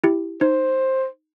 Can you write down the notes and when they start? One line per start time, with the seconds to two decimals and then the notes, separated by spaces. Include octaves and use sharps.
0.04 E4 G4
0.41 D#4 C5